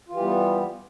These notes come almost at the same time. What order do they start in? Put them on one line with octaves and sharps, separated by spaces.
F4 E3 G4 G3 B3